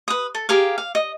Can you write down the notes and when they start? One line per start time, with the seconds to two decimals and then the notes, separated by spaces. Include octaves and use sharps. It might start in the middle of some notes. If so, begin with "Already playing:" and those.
0.08 B4 D#6
0.35 A4
0.49 G4 G#4 A#4 F5
0.78 F5
0.95 D#5